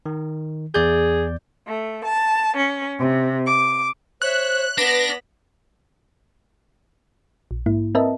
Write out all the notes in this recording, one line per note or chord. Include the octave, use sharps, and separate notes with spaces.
D#3
E2 G#4 D5 G6
A3
A5
C#4
C3
D6
C5 C#5 E5 F#6
B3 D4 B4 B5 A#6
A#1
G#2 A#3 E4
C4 A#4 B4 D#5 E5 A5